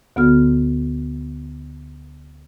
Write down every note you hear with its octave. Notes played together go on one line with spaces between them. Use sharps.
D2 D3 B3 F#4 A4 F6